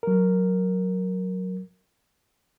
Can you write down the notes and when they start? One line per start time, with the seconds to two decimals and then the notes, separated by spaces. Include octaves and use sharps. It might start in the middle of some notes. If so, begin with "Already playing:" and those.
0.03 F#3 A#4